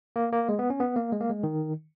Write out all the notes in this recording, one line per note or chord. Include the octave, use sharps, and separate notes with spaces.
A#3
A#3
G#3
B3
C#4
B3
A#3
G#3
A#3
G#3
D#3